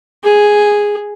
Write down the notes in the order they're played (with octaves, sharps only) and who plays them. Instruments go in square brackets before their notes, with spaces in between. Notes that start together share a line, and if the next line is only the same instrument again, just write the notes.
[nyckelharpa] G#4